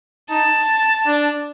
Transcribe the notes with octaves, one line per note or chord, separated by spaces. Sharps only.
D#4 A5
D4